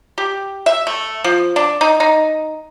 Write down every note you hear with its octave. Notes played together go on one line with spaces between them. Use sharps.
G4
E5
A3
F3
D4
D#4
D#4